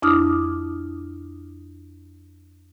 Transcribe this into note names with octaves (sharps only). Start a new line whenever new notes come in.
F2 D4 E4 D6 D#6 F6